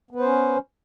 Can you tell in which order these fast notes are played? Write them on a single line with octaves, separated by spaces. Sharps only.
B3 B4 C5 C#4